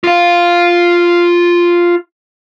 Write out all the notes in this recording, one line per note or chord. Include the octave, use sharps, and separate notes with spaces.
F4 F5